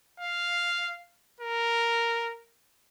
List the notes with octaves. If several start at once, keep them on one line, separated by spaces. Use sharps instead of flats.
F5
A#4